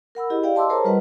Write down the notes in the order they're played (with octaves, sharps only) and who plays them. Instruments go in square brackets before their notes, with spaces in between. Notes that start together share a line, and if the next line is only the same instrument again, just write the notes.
[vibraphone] A#4 F#5 B5 E6
E4 G4 G#4 D#5
G4 D5 F5 G5
D#5 A5 C6 D6 E6
G#4 A#4 C5 C#5 A5 A#5
G3 F4 B4 D#5 F#5